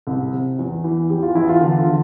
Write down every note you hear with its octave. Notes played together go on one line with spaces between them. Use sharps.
C2
C3
E2
E3
E2 G4
F4
E2 E4
F4
D3
F4
D3